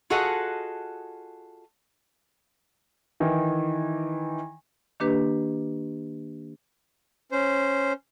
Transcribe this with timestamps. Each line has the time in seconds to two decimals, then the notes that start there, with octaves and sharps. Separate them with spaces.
0.10 F4 F#4 G#4 A4 D#5 F#5
3.20 D#3 E3
5.00 D#3 A#3 D4 G4 B4
7.32 C#4 C5